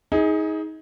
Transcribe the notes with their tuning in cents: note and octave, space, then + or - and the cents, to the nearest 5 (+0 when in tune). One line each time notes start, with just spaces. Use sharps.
D#4 +30 G#4 +0